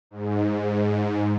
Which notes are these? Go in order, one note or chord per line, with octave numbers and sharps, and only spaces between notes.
G#2